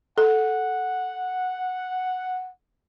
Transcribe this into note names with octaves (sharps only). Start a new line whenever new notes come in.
A4 F#5